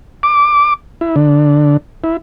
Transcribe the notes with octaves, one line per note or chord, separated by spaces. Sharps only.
D6
E4
D3
E4